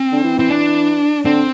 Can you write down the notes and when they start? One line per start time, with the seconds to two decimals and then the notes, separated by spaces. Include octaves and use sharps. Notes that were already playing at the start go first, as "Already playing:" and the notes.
Already playing: C4
0.12 D3
0.24 E3
0.37 E3 C4
0.49 D4
1.25 D3 C4